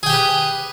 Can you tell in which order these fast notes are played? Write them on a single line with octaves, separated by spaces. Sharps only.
G#4 G5 G4 B4